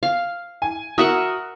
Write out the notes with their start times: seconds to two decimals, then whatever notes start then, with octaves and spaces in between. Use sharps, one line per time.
0.03 F5
0.62 G#5
0.98 F#4 A#4 E5 F#5 D#6